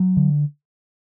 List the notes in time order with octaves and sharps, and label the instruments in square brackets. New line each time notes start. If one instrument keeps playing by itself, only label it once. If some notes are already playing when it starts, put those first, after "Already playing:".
Already playing: [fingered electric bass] F#3
D3